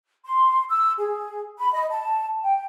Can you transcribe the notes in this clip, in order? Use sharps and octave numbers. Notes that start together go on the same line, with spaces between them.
C6
E6
G#4
B5
D#5
A5
G5